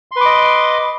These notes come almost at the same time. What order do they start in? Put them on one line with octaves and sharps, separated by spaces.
C6 B4 D6 D#5